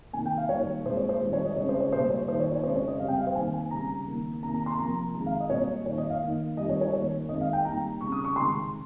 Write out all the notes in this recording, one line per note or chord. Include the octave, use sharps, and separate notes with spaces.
C3 D#3 A#3 G#5
G5
F5
D#3 G3 A#3 C#5
A#2 G#3 C4 C5
C#5
C5
D#3 G3 C4
C#5
D#5
C#3 G#3 C4 C#5
C5
C#5
A#2 G3 A#3 C5
C#5
D#3 A#3 C5
C#5
C#5
C#3 G#3 C4 C5
C#5
D#5
C3 G3 C4 F5
G5
F5
C5
D#3 A#3 G#5
G#5
C#3 G3 C4 A#5
D#3 A#3
C3 D#3 A#3 A#5
A#5
C6
C3 F3 A#3 A#5
D#3 G#3 C4 A#5
F5
D#5
A#2 G3 C4 C#5
D#3 A#3 C#5
D#5
F5
D#3 A#3
D#3 G3 C4 D#5
C#5
C#5
D#3 A#3 C#5
D#3 G#3 C4 D#5
F5
G5
D#3 G3 A#3 A#5
C#3 G3 C4 C#6
D#6
C#6
C3 D#3 G#3 C6